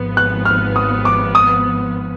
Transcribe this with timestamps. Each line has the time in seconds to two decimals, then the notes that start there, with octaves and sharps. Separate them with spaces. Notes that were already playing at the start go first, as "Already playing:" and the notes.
Already playing: G#1 G#2 F3 B3
0.17 F#6
0.45 F6
0.76 D#6
1.05 D6
1.35 D#6